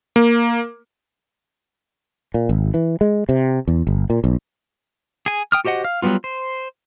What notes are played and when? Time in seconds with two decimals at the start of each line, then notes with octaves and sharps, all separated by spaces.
0.16 A#3
2.34 A#2
2.49 G#1
2.74 E3
3.01 G#3
3.29 C3
3.68 E2
3.87 G1
4.10 A#2
4.24 B1
5.26 G#4 G#5
5.52 G5 D#6 F6
5.65 F#4 G4 C5 D#5 F#5
5.84 F5
6.02 F#3 G3 A#3 B3 F4
6.24 C5